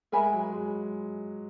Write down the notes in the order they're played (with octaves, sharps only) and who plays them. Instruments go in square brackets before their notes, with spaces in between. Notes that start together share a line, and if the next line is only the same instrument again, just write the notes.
[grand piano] G#3 [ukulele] A#4 E5 G#5 B5
[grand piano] F#3
G#3